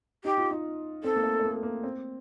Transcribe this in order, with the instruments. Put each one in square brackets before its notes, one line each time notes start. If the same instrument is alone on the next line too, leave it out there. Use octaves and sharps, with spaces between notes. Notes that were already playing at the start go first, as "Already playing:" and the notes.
[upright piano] D#4 [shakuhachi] G4
[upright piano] F4
D#4
[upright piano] C4 [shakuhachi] A4
[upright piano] A#3
A3
A3
A#3
A#3
C4